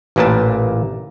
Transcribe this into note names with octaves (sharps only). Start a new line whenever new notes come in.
A1 A#2 A#3 B4 G5 A5